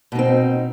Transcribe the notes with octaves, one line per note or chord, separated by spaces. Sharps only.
B2 C4 D#4